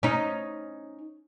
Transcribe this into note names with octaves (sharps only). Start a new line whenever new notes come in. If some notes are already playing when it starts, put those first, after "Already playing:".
C#4 D#4